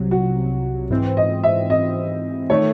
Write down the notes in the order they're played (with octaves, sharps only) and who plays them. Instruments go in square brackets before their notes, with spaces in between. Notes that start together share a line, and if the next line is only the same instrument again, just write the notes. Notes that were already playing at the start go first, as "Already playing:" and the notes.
Already playing: [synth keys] C2 C3 F#3
[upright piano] F#4
[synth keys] G#2 E3 C4
[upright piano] D#5
E5
D#5
[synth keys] D#3 A3 [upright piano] C#5